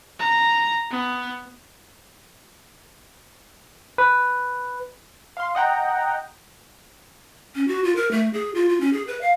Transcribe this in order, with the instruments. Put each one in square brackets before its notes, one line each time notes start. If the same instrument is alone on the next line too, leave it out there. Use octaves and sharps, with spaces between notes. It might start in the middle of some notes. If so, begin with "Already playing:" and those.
[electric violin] A#5
B3
[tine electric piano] B4
[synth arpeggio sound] F5 C6
D#5 F#5 G5 A#5
[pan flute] C#4
F#4
F4
A#4
A3
G#4
F4
F4
C#4
G#4
B4
F5